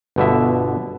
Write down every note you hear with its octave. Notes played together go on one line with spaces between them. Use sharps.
G1 B2 D3 E5